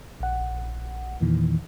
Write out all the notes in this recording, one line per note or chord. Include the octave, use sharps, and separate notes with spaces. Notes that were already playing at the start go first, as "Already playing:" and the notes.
A#1 F#5
E2 A#2 D#3 E3